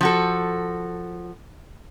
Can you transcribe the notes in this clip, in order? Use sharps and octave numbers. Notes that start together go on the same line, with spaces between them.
F3 F#4 A4